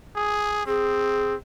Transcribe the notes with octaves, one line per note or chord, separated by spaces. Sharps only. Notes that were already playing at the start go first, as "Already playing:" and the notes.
G#4
C4 G#4